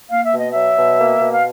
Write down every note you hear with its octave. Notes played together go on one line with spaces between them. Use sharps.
A#3 F5
E5
B2
D#5
F#3 E5
B2
A#3
B2
F5